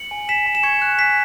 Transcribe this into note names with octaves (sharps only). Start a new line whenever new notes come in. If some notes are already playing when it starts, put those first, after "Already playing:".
Already playing: C#7 F#7
G#5
G#5 B6 E7
G#5
E7
C#6 G#6 C#7
F#6
G#5 B6